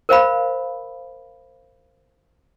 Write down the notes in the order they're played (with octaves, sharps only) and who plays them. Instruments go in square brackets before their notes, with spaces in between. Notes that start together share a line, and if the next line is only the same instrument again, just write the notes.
[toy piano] A#4 C5 F5 B5